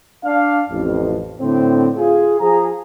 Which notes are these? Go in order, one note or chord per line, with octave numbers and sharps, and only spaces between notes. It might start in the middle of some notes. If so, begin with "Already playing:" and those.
D4 F5
A1 F2
A2 D3 C4
F4 G#4
F3 G#4 A#5